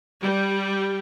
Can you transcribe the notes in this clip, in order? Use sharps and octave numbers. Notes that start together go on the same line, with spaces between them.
G3